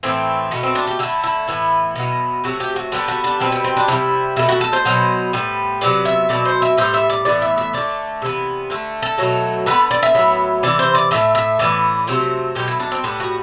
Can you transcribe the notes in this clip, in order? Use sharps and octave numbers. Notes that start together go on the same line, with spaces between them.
A2 E3 A3 C4
B2 A3 B3
C4
D4
G4
D3 A3 E4
E4
A2 E3 B3
B2 F#3 B3
C3 F#3 A3 F#4
G4
F#4
D3 G3 B3 D4
F#4
D4
B2 G3 B3 C4
C4
C4
D4
C3 E3 G3 E4
B2 A3 E4
F#4
A4
C5
B2 F#3 B3
A2 G3 B3
C3 F#3 B3 D5
E5
B2 F#3 A3 D5
C5
E5
A2 G3 B3 C5
E5
D5
A2 E3 B3 D5
E5
E5
D3 A3 D5
C3 E3 B3
D3 A3
A4
B2 F#3 A3
D3 G3 B3 B4
D5
E5
A2 F#3 B3
C3 E3 D5
C5
D5
A2 F#3 A3 E5
E5
A2 E3 B3 D5
C3 F#3 A3 C5
B2 F#3 A3 G4
E4
D4
C4
A2 G3 B3 D4
F#4